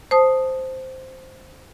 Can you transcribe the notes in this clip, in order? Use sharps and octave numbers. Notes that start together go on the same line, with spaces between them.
C5 A5 D#6